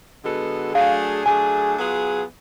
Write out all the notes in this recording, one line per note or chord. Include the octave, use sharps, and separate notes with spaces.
D3 G#3 B3 F#4 A4
F#3 A3 D4 G#4 F5
F#3 A3 D4 G#4 G#5
F#3 B3 F4 G#4